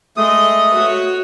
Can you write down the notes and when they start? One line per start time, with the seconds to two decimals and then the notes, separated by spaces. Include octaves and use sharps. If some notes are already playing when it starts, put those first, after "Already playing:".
0.17 G#3 A3 D#5 D#6
0.74 F#4 C#5